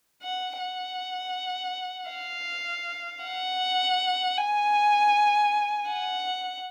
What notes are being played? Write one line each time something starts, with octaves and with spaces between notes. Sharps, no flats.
F#5
F#5
F5
F#5
G#5
F#5